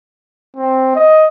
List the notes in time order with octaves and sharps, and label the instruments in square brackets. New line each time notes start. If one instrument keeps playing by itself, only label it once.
[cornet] C4
D#5